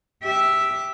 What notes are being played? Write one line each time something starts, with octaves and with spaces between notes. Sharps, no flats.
G4 E5